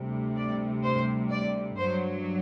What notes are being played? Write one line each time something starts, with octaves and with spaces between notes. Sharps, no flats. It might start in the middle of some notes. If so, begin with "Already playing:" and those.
Already playing: D2 C3 G3
D5
C5
D5
G2 F#3 C5